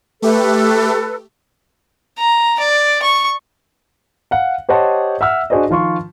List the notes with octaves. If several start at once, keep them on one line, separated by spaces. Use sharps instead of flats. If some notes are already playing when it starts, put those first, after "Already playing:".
A3 G4 A4 B4
A#5
D5
C#6
F5 F#5
G4 C5 C#5 D#5 F#5 A5
E5 F#5 E6 F6
D4 F#4 G#4 C5 D5 D#5
D#3 F3 F4 C6 C#6